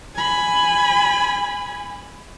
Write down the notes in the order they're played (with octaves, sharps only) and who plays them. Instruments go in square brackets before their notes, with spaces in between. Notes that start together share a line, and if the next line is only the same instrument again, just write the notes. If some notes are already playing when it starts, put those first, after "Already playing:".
[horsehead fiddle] G#5 B5